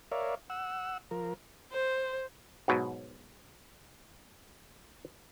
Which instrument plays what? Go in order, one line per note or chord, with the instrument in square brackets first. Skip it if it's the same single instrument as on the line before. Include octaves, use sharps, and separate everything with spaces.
[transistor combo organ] A#4 C#5 D5 E5 F5
F#5 E6
F3 A#4
[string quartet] C5
[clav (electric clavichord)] G#2 B2 F#3